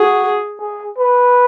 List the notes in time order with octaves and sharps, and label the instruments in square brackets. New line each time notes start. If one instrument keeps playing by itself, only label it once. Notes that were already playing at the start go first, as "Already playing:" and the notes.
Already playing: [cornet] F#4 [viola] G#4
[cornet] G#4
B4